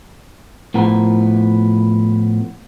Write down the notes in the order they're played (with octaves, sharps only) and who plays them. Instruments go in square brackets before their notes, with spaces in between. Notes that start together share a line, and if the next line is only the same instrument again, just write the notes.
[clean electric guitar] A2 F3 B3 A#4